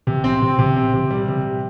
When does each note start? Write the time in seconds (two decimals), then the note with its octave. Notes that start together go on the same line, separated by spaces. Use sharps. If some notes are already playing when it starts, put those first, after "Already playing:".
0.07 C3
0.24 C4
0.42 C3
0.59 C3
0.76 C4
0.93 C3
1.10 G3
1.28 C3